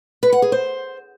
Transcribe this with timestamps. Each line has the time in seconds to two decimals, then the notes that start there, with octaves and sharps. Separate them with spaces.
0.23 B4
0.32 F#5
0.42 G#4
0.52 C5